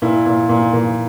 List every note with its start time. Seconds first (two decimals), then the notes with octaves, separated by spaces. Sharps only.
0.02 A#2 E4
0.26 A#2
0.49 A#2
0.73 A#2